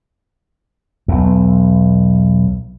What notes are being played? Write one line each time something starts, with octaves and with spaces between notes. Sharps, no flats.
B1 E2